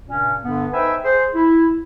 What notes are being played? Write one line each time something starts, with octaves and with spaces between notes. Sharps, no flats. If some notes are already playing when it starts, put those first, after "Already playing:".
G2 A#2 C#3 C#4
G2 D3 B3
D#4 B4 C5 E5 G5 G#5
G#4 C5
E4